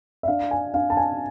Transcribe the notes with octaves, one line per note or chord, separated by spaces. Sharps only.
E5
D4 F5
G#5
D4 F5
A5
G#5